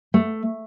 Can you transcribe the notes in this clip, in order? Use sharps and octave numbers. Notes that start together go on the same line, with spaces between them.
A3